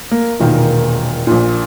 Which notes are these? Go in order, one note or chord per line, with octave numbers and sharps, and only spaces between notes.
A#3
E1 A#2 D#3 A#3
A#1 A#2